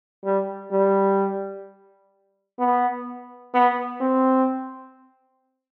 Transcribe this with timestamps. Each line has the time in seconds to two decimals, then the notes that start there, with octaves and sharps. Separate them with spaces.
0.24 G3
0.71 G3
2.59 B3
3.54 B3
4.01 C4